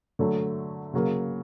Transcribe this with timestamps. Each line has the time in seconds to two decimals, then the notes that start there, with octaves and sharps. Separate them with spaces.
0.19 D3 F#3 A3
0.94 C#3 F#3 A#3